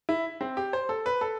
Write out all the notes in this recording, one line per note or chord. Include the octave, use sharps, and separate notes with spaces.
E4
C4
G4
C5
A4
B4
A4